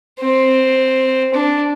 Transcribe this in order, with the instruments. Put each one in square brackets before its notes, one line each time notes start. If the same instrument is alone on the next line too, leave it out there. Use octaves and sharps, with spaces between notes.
[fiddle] C4
D4